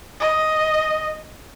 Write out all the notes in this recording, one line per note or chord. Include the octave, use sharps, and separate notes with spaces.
D#5